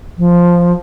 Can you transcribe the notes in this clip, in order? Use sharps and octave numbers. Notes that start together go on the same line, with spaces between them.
F3